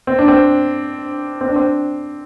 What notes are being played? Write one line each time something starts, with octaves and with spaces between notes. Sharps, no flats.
C4
D4
C4
C4
D4
C4